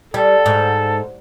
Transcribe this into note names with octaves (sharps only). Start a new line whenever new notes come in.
G3 A4
G#2